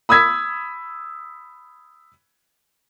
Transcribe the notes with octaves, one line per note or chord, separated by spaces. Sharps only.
B5 D#6 E6 G#6 B6